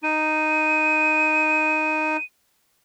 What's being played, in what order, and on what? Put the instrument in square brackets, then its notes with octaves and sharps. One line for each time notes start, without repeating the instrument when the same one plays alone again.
[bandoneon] D#4 [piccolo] D#7